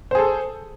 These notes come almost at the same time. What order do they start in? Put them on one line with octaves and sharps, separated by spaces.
C5 G#4 A4